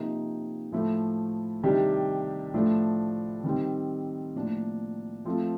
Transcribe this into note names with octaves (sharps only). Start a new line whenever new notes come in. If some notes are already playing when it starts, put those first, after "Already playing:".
Already playing: C3 F3 A#3 D#4
A2 F3 A3
C3 D#3 G3 D4 G4
A2 F3 A3 D4
D#3 G3 C4
A2 F3 A#3 D4
F3 A3 C4 F4